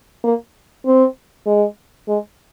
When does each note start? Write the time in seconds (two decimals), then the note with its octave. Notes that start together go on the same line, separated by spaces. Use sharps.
0.24 A#3
0.85 C4
1.46 G#3
2.08 G#3